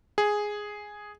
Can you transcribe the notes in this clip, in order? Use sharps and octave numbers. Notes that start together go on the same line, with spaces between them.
G#4